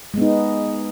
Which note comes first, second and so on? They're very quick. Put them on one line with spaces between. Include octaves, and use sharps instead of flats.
G#3 B3 D#4